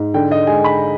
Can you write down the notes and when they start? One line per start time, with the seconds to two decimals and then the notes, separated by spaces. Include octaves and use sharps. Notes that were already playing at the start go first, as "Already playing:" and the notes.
Already playing: G#2
0.14 D3 G5
0.31 D#5
0.47 G#3 G#5
0.64 B5